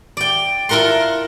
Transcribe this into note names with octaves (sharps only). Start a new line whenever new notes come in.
D5 G5
E4 F4 A#4 F#5 C6